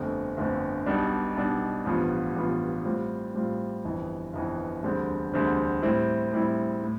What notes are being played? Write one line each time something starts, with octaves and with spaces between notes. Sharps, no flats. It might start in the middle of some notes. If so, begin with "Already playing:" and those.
Already playing: G1 F2 D3 A3 C4
G1 F2 D3 A3 C4
B1 B2 G3 D4
B1 B2 G3 D4
A1 G2 F3 B3 F4
A1 G2 F3 B3 F4
A2 G3 C4 F4
A2 G3 C4 F4
G1 F2 E3
G1 F2 E3
E1 D2 D3 G3 C4
E1 D2 D3 G3 C4
A2 G3 C4 E4
A2 G3 C4 E4
A2